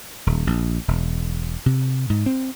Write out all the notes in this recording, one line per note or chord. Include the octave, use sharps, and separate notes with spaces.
D#1
A#1
E1
C3
G#2
C4